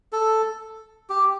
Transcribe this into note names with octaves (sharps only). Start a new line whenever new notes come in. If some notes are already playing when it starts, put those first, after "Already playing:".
A4
G4